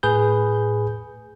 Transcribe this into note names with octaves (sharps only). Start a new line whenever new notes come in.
A2 G#4 B4 G6